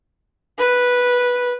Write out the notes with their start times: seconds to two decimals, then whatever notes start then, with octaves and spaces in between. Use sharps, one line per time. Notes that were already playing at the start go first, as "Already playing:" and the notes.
0.58 B4